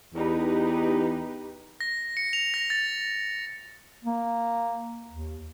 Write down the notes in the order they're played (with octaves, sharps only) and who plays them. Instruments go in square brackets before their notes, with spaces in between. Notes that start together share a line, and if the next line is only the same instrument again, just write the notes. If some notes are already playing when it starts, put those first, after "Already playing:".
[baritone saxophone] E2 [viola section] D#4 G4 B4
[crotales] A#6
C#7
F7
A#6
A6
[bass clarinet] A#3
D#2